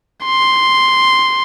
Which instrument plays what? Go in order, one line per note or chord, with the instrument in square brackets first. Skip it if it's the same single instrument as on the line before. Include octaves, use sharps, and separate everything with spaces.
[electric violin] C6